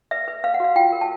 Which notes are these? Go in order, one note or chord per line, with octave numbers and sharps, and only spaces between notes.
B4 E5
B4
B4 F5
F#5
F#4 F5
F4 G5
A#4
A5